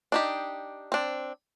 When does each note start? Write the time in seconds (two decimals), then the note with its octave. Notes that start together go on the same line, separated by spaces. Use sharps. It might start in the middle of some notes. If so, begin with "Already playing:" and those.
0.12 D4 D#4 G4
0.92 C4 D4